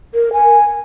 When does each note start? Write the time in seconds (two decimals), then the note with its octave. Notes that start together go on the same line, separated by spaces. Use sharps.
0.15 A#4
0.33 G#5